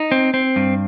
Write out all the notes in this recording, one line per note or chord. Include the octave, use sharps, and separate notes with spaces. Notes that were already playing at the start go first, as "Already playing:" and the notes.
Already playing: D#4
C4
C4
G2